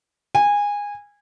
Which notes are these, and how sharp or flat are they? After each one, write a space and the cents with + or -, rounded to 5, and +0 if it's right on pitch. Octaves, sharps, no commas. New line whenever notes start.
G#5 -20